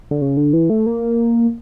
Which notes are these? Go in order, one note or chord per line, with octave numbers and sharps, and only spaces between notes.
D3
C#3
D3
E3
A3
A#3